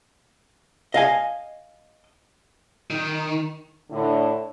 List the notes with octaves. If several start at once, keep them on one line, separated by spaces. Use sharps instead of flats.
D#5 F5 G#5
D#3
A2 D3